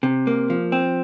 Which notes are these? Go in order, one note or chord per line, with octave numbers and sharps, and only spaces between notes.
C3
A#3
F3
C4